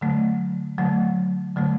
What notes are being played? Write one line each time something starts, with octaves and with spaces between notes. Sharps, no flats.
D3 F#3 A3
D3 F#3 A3
D3 F#3 A3